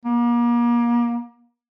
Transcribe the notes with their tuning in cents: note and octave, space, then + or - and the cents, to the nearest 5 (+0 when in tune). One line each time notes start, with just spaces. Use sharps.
A#3 +35